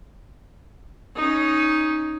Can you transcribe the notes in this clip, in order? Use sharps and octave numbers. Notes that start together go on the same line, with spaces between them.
C#4 D#4